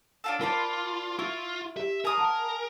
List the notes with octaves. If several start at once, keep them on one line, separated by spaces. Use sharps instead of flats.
D4 F4 A4
F4 A#4 C5 D5 A5 B5 C7
E4 F4 C#6 A6
G4 E5
G#4 A#4 D#6
F#5 A5